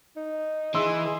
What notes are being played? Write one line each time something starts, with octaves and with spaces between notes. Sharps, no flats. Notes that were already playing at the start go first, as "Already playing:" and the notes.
D#4
E3 G#4 D#5 E5 C6 E6